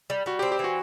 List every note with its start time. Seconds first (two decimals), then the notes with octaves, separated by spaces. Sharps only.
0.10 G3
0.26 G3 F#4
0.39 C4 G4
0.52 G4
0.59 E3
0.64 F#4